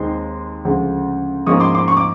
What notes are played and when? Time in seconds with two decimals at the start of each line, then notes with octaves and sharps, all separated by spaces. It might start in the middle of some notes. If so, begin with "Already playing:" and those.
Already playing: D#2 D#3 G#3 C4 D#4 C6
0.65 D2 C#3 F3 G#3
1.46 G#2 F3 A#3 C#4 C#6 D#6
1.60 C6 D6
1.75 C6 D6
1.88 C#6
1.97 D6